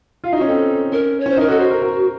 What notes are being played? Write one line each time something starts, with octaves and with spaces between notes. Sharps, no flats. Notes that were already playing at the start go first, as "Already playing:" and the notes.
F4 F5
D#4
F#4
C#4
C4 A4
C#4 A#4
C#5
C#4 C5
D#4 A#4
F#4 A4
F#4 C5
A#4
A#4